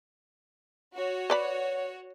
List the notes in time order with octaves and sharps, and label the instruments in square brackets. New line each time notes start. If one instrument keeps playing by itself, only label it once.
[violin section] F#4 C#5
[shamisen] B4 D5 B5